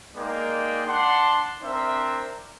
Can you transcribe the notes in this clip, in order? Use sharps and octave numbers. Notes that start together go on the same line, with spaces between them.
G#3 A#3 D#4 D5 G5
D4 F#5 A5 C6
C4 D4 A#4 C5 E5